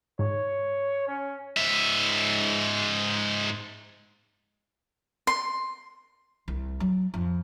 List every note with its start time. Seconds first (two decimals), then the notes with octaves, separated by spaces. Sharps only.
0.19 G#2 C#5
1.07 C#4
1.57 G#2 E5
5.27 C6
6.48 C2
6.80 F#3
7.14 F2